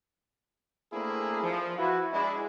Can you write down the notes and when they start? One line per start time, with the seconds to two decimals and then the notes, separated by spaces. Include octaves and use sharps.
0.92 A3 A#3 C4 D4 E4 G#4
1.43 F3
1.78 E4 F#4 B4
2.12 G#3 D4 E4